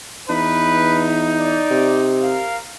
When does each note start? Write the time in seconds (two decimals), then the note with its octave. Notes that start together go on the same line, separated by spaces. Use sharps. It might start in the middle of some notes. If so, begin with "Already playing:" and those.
0.29 E2 D#4 B4
1.38 D5
1.71 C3
2.21 A#4 F5